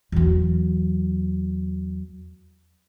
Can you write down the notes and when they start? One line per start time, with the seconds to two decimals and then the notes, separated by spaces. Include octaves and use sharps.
0.12 E2 F#3